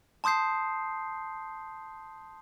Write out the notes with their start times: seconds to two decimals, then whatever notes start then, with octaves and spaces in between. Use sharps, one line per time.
0.24 A5 C6 D#6 G6 C7